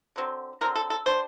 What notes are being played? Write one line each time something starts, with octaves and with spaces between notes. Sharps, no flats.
D3 F#3 C4
D3 F#3 C4 A#4
A4
A4
G3 D4 C5